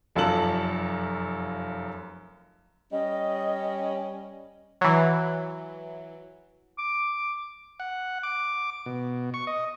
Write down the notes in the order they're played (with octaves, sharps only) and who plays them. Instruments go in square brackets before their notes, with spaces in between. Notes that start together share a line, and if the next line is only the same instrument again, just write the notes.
[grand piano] F1 F#2 F4 A4 A5 F#7
[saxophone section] G3 C#4 [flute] D#5
[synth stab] E3 F#3
[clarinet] D6
[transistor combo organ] F#5
D6
B2
C#6
D#5